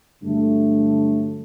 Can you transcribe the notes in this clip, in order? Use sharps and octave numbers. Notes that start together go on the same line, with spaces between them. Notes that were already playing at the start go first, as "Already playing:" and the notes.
G2 D3 F#3 A3